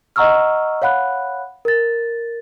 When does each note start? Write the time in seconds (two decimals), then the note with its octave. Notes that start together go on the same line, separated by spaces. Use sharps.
0.16 D#5 F#5 A#5 C#6 E6 F6
0.82 C#5 F5 F#5 B5 F#6
1.65 A#4 A6